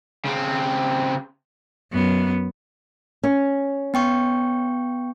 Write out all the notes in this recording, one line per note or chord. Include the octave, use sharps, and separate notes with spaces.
C#3 C4
F#2 B3
C#4
B3 G5 C#6